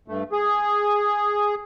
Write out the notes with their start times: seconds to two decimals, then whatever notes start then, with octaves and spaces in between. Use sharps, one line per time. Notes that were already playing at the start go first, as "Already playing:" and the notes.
0.08 G2 A3
0.32 G#4